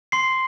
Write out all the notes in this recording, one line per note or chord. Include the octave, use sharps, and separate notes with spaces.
C6 C7